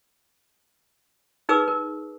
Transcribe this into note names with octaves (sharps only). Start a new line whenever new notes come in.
D#4 G#4 A#4 B4 D6 E6
A#4